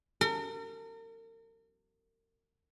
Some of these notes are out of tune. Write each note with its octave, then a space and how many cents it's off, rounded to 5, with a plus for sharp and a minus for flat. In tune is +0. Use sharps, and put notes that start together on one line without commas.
A#4 -40